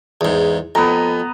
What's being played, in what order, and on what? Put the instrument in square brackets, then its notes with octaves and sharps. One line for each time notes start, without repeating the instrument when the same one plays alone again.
[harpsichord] E2 G#2
[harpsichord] F2 [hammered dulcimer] B3 A#5